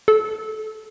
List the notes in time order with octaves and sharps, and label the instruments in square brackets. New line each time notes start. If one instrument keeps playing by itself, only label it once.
[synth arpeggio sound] A4